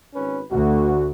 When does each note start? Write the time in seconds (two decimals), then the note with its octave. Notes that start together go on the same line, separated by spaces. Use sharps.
0.15 G#1 C#4 B4
0.52 D2 F#4